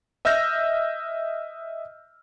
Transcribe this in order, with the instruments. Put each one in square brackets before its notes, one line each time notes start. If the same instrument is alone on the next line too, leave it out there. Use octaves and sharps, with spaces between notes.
[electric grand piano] D#5 E5 E6 F6 G6 A#6